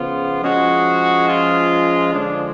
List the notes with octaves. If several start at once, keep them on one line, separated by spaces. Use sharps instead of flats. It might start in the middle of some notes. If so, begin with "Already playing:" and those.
Already playing: C#3 F3 B3 F4
F3 G#3 C#4 F#4
F4
D3 F3 G#3 D4